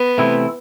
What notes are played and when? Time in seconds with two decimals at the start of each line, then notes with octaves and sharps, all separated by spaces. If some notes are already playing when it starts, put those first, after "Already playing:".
Already playing: B3
0.18 C3 E3 A3 C4 E4